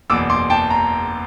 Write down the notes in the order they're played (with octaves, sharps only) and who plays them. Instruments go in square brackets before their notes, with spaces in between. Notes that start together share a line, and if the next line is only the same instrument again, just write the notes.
[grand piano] F#1 E2 B2 D6 E6
C6 D6
G5 A5
A#5